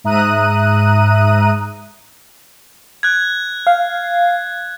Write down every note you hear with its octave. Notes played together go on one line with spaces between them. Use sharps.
G#2 E5 A#5 D#6 F#6 D#7
F#6 G#6
F5